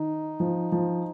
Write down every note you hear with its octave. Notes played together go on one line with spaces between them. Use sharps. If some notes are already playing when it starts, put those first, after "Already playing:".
Already playing: D#3 D#4
F3
F3